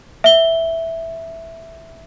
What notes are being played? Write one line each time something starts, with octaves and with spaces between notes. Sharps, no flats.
E5 G7